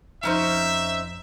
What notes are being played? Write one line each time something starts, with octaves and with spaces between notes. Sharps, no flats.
F2 C#4 D#4 C5 E5